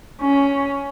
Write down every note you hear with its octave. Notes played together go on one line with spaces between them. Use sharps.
C#4